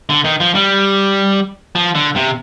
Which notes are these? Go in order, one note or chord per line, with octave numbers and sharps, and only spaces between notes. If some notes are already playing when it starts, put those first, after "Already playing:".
D3
D#3
F3
G3
F3
D3
C3